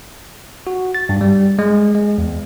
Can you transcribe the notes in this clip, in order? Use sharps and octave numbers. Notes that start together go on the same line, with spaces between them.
F#4
A6
G2
G3
G#3
G#3
E2